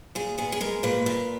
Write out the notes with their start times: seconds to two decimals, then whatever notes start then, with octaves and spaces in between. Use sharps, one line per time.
0.15 A#2 G#4
0.38 B3 G#4
0.52 G#4
0.61 G#3 A#4
0.83 A#2 B4
1.06 A#2